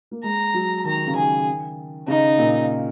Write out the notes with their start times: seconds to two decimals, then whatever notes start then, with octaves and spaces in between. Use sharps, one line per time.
0.11 A#3
0.24 G#3 A#5
0.54 F#3
0.85 D#3 A#5
1.07 C#3
1.16 D#3 G#4
2.08 C#3 D#4
2.38 A#2